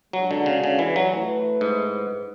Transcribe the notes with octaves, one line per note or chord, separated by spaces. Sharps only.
F#3 G#3 D4 F#4
D3
C#3
C#3
E3
F#3
A3 E4 B4
G#2